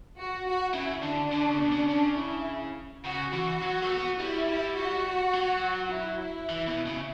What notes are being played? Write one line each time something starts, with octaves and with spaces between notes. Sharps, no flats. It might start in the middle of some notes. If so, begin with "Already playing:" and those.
F#4
F#4
C#3 E4
D3 D4
D3
C#3
B2
C#3
C#3 D4
E4
C#3 F#4
E3 F#4
F#3
A3
B3
G3 E4
E4
F#4
F#3
E4
E4
E3
B2
C#3